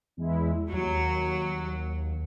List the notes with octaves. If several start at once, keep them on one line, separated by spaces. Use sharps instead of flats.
E2 G#3 E4
D#2 F#3